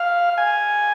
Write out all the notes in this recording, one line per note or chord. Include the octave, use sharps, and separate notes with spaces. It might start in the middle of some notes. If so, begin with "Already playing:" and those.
Already playing: F5
G#5